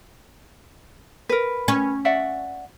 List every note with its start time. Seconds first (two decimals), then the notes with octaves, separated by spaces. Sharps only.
1.29 A#4 B4
1.68 C#4
2.05 D5 E5 F#5